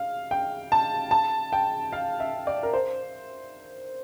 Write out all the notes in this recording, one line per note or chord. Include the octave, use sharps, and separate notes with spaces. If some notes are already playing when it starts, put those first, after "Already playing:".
Already playing: F5
G5
A5
A5
G5
F5
E5
D5
A#4
C5